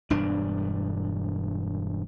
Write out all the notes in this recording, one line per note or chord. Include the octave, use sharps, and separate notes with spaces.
E1 G2 D4